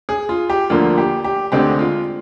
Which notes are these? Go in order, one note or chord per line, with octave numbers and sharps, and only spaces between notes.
G#4
F4
G4
D2 D3 F3 A#3 F4
G4
G4
D2 D3 G#3 C4 G4
F4